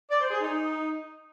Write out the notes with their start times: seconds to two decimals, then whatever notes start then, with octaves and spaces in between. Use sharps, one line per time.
0.11 D5
0.21 C5
0.31 G#4
0.41 D#4